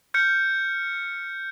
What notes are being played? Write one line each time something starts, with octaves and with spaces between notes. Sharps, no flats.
F6 G6 C#7